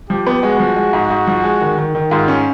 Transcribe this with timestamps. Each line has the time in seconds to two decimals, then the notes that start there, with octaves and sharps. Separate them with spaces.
0.10 F3 G4
0.27 B3
0.43 G#3 F#4
0.60 F3
0.76 G#3
0.93 G#2
1.10 G#2
1.27 F3
1.44 G#3
1.61 D#3
1.78 D#3
1.95 D#3
2.11 G#2 F4
2.28 C#4